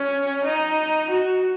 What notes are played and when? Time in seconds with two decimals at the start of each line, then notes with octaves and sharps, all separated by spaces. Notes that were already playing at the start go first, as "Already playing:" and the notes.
Already playing: C#4
0.44 D#4
1.10 F#4